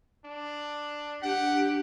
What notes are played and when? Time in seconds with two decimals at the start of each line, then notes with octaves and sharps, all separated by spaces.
0.25 D4
1.22 D4 G4 F#5